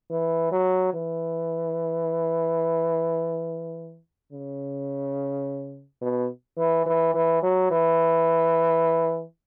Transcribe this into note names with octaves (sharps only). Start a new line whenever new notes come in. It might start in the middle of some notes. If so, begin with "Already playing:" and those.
E3
F#3
E3
C#3
B2
E3
E3
E3
F#3
E3